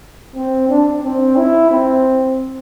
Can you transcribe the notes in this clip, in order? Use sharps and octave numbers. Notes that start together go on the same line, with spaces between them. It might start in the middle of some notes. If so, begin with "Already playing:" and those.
C4
D4
C4
E4
C4